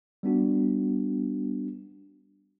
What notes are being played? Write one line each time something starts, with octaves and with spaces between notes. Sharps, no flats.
G3 B3 D4 F#4